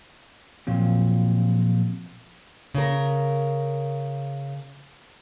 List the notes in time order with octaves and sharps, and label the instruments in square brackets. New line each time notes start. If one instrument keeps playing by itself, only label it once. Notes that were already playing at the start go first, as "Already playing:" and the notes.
[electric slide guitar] A#2 F3 F#3 C4
[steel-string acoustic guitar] C#3 A#4